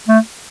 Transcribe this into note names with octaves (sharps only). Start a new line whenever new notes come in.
A3